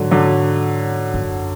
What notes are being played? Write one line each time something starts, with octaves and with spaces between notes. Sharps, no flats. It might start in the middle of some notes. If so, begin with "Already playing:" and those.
Already playing: G#2 D3 F#3
D3 F#3
F#2